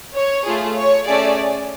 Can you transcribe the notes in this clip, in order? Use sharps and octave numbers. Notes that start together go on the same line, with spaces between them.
C#5
A3 F4 G#4
C#5
A3 C#4 G#4 D5